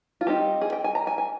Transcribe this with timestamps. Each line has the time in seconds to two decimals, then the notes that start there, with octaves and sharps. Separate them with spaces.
0.21 F4
0.27 G3 C4 D#4 G4
0.61 G#4
0.73 G5
0.84 G#5
0.95 A#5
1.07 G#5
1.18 G#5